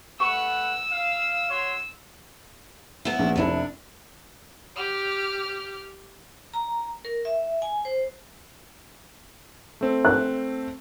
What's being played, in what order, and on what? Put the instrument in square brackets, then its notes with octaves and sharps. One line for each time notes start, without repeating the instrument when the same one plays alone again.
[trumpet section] A3 B4 F#5 [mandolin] C#6 [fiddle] E6
[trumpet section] F5
F#4 C#5 C6
[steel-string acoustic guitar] B3 E4
[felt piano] A#1
[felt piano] F1 E4 [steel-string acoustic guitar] C3 D4
[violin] G4 F6
[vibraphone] A#5
A#4
E5
G#5
C5
[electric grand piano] A3 C4
[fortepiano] F#6